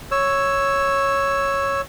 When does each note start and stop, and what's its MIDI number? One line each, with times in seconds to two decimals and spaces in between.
0.11 1.81 73
0.11 1.81 88